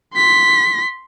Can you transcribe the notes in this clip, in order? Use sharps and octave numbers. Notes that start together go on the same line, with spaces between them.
C6 B6